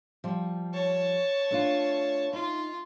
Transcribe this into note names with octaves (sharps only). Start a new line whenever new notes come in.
F3 G3
C#5 A5
A3 D4 F4
D#4 F4